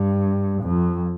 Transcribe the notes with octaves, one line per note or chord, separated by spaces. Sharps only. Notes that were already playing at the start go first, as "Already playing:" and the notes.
Already playing: G2
F2